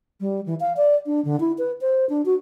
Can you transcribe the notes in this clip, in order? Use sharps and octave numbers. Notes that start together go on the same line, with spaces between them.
G3
E3
F5
D5
D4
D3
E4
B4
C5
D4
F#4